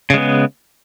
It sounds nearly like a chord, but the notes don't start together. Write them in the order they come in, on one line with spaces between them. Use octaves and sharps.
C#3 G#3 B3